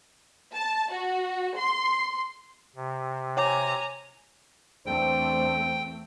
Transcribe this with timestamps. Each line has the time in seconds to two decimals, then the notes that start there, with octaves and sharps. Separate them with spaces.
0.54 A5
0.91 F#4
1.56 C6
2.76 C3
3.37 C#5 G#5 A#5 D6
4.86 E2 A3 C4 D4 C5 G5